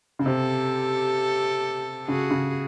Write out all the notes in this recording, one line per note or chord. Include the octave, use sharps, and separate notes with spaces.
C#3
C3 G4 A4
C#3 F#4 G#4
C#3